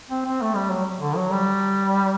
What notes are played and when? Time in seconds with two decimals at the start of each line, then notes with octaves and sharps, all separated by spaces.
0.10 C4
0.26 C4
0.41 A3
0.55 G3
0.71 F#3
1.01 D3
1.16 F#3
1.32 G3